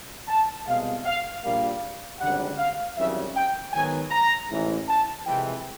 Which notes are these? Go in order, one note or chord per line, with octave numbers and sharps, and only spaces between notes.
A5
C2 B2 G#3 F5
F5
A#1 A#2 G3 A#3 F5
G#1 F#2 D3 G3 F#5
F5
G#1 F#2 C#3 E3 G3 E5
G5
G#2 D#3 F#3 B3 G#5
A#5
A1 G#2 E3
A5
F2 C3 E3 G#3 G5